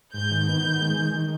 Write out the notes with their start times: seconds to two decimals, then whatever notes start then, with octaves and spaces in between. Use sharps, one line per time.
0.13 G#2 G6
0.31 D#3
0.47 B3
0.64 D#3
0.81 G#3
0.98 D#3
1.15 D#3